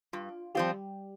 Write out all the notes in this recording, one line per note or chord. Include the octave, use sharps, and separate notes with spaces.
G2 F4
F3 G3 C4 F4 G4